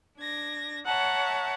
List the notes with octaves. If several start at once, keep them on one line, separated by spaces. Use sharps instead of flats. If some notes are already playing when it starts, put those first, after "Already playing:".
D4 G#6 A#6
C#5 E5 F#5 A5 A#5